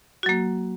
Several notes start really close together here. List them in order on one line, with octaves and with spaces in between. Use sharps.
F#4 F#3 A#3